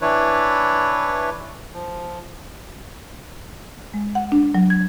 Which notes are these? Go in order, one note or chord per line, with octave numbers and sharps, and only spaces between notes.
E3 D4 E4 B4 C#5
F3
G#3
F#5
D4
F#3
G#6